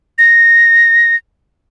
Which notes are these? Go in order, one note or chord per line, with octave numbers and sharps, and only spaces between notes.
A#6